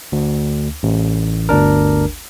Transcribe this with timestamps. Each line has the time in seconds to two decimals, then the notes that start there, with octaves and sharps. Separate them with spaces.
0.12 D2
0.83 A1
1.49 G1 D2 D4 A#4